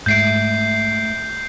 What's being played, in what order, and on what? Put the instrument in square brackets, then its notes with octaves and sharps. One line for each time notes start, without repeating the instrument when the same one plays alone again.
[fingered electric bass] G#2 [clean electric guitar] A3 E5 [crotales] G6 C7 D7